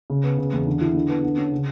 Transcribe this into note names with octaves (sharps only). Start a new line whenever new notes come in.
C#3
B3
C#3
E2
D3
E4
D3
B3
D3
C#4
C#3